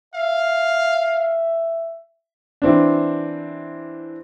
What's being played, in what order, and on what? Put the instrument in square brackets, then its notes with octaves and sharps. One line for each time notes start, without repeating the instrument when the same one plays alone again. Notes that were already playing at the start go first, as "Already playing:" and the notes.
[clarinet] E5 [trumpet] F5
[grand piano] E3 C4 D4